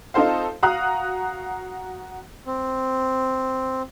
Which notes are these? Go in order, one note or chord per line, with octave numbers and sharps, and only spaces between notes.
C4 D#4 F4 A4 C5 F5
F#4 F5 A#5 D#6 F#6
C4